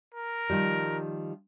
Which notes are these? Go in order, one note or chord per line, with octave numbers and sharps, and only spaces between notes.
A#4
D#3 F3 G3